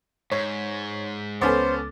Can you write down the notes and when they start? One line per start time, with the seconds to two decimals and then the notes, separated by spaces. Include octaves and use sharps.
0.32 G#2 C#5
1.41 C#2 B3 C#4 A4 C5 D6 A6